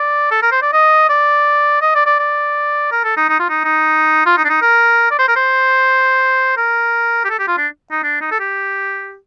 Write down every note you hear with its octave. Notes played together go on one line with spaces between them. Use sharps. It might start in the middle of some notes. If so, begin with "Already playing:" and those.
Already playing: D5
A4
A#4
C5
D5
D#5
D5
D#5
D5
D5
D5
A#4
A4
D#4
D#4
F4
D#4
D#4
F4
D#4
D4
D#4
A#4
D5
C5
A#4
C5
A#4
G4
A4
G4
F4
D4
D#4
D4
D#4
A4
G4